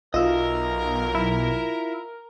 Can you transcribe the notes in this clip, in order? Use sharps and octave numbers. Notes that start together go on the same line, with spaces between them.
B1 F4 A#4 D#5 E5
E4